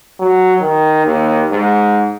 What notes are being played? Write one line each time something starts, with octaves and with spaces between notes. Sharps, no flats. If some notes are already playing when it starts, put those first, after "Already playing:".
F#3
D#3
D#2
G#2